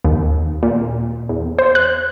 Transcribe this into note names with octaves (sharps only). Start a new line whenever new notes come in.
D#2
A#2
E2
C5
F#6